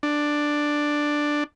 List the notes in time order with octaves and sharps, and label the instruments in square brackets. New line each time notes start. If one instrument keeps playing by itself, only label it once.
[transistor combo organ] D4